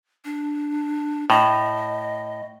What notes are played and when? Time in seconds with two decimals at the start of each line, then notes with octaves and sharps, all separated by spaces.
0.25 D4
1.30 A2 D#5